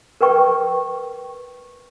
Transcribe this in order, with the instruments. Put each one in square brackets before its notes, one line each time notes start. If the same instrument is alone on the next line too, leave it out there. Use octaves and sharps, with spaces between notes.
[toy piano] A#4 B4 G5 C#6